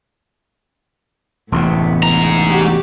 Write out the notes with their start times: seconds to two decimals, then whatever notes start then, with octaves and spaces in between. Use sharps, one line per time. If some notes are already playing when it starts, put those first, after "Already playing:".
1.52 E1 A1 A2 C3 B3
2.03 G#2 A#5
2.47 F#4 G4